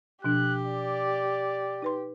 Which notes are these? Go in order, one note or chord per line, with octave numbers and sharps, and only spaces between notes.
B2 F3 D4 G4 F#6
D5
D#4 B4 C6